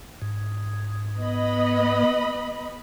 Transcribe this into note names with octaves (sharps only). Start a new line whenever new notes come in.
G#2
B3 D#5 B5